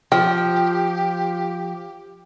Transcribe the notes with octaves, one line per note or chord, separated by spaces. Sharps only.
F3 G4 G5